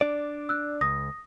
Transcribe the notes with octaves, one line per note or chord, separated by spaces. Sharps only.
D4 D5
E6 F#6
C#2 D#6 A#6